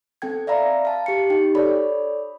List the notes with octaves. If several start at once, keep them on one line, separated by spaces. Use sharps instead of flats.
C4 A4 G5 G#6
D5 E5 F5 A#5 B5
F5 A5
G4 C#7
D#4 G4 G5
A4 C#5 D5 B5